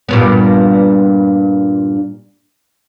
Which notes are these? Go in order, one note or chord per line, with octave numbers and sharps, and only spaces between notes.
G2 A#2 B3